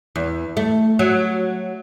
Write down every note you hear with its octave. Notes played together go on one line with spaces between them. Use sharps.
E2
A3
F#3